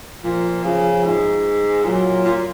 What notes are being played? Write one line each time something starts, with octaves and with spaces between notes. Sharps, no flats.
A#2 F3
C#3 F3
G#2
A#2 F#3
A#2